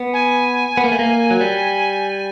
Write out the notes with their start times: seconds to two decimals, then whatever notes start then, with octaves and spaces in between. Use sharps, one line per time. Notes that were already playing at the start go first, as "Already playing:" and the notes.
Already playing: B3
0.13 G#5
0.77 B3
0.84 A#3
0.92 A3
0.99 A#3
1.31 F#3
1.41 G3